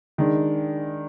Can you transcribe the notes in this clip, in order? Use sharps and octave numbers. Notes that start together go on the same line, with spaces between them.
D#3 G#3 D4